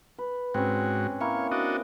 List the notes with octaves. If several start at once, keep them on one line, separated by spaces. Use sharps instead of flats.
B4
G#2 C4 C#4 F#4
A#3 E4 A#4 C#5
D4 F#4 D#5